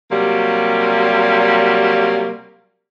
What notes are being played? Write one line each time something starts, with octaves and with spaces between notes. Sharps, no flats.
C3 F#3 G3 A#3